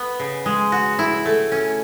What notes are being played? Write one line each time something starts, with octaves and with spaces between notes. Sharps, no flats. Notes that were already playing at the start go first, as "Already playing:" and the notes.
Already playing: B3
C#3
G#3
F#4
E4
A3
C#4